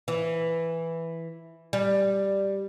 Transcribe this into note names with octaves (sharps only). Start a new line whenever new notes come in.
E3
G3